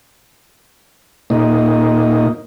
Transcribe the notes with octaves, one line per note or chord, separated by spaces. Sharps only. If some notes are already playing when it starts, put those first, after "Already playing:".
A#2 D#4